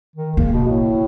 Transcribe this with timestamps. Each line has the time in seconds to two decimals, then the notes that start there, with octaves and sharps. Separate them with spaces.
0.16 D#3
0.37 C#3 A#3
0.52 B2
0.67 A2